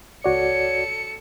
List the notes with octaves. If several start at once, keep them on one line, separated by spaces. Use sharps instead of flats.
C#2 F#4 A4 C#5 D5 C#7